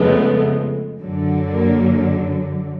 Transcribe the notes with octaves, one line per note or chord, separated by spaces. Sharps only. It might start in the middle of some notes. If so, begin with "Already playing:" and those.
Already playing: F2 C#3 F3 G#3 A3 B3
F#2 D3 F#3
A#3